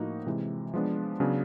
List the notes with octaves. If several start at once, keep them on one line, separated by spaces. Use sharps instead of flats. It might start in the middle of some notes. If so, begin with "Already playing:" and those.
Already playing: A2 F3 A#3 D#4 F#4
C3 E3 G#3
F3 G#3 B3 D4
C#3 F#3 B3 D4